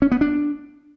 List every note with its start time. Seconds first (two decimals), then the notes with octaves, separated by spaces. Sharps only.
0.02 C#4
0.12 B3
0.21 D4